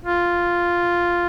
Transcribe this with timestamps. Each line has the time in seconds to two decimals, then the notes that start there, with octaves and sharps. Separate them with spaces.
0.05 F4